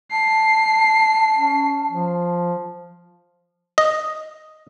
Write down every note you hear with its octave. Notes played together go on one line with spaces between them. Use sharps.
A5 C7
C#4
F3
D#5